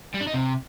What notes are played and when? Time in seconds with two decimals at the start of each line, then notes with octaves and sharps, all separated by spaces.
0.15 G3
0.21 D4
0.27 D#4
0.34 C3